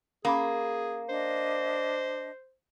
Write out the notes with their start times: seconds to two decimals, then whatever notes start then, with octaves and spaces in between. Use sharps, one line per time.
0.25 A#3 C#4 G#4 B5 D6
1.09 D4 C5 D#5